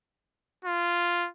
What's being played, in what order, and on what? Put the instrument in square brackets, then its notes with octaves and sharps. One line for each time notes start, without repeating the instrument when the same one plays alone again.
[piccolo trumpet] F4